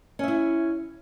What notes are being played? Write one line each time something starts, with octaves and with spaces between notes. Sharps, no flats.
C#4 E4 E5